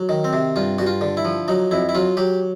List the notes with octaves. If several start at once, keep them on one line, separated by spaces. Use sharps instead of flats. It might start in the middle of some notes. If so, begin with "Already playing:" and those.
Already playing: F#3
D#3
C4
C3
G2 F4
G2 F#4
F4
D3
E4
F3
F#3 D#4
F2 E4
E4
F#3 F4
F#3 G4